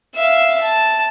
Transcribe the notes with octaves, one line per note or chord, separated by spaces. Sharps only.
E5 F5
A5